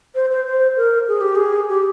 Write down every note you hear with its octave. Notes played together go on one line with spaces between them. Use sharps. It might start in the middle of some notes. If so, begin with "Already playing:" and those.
C5
C5
C5
A#4
G#4
G4
G#4
G4